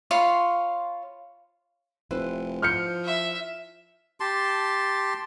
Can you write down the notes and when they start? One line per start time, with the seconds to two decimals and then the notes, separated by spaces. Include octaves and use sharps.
0.11 F4 C#5 B5 C6
2.11 F1 E4 B4 C5
2.62 F3 F6 G6 C#7
3.05 E5
4.20 G4 A5 C6